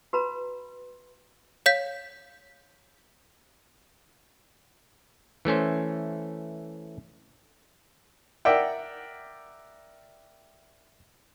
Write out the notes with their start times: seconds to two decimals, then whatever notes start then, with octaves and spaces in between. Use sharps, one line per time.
0.13 F#4 B4 A#5 B5
1.66 C#5 F5 G6 B6
5.45 E3 A3 C#4 C5
8.45 A#4 D5 E5 F#5 G5